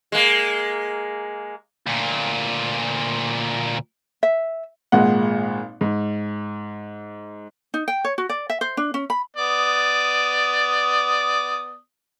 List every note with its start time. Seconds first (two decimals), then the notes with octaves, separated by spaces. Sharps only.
0.12 G#3 A#3
1.87 D2 A#2
4.23 E5
4.92 G#1 A#2 G#3 F#5
5.81 G#2
7.74 D#4
7.88 G5
8.05 C#5
8.18 F#4
8.29 D5
8.50 E5
8.61 C5
8.77 D4
8.94 C#4
9.10 B5
9.37 B3 D5 D#6